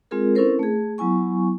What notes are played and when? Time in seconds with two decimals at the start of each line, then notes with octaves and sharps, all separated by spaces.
0.11 G#3 C4 F4 G#4 A#4
0.35 C4 C#4 E4 A4 A#4 C5
0.59 A3 G#4
0.98 F#3 B3 E4 G#5 C#6